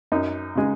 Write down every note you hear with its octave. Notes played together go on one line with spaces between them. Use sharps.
F#2 D#4
C#3 G#3